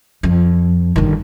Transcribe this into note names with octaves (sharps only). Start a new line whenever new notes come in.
F2
G1 D#3